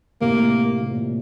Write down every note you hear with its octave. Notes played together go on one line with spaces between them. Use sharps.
A2 C3 A#3
C3
A#2